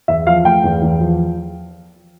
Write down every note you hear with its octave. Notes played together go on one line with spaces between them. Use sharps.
E2 E5
F3 F5
A3 G5
E2
E2
F3